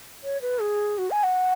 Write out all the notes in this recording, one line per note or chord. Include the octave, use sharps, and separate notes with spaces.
C#5
B4
G#4
F#4
G#5
F#5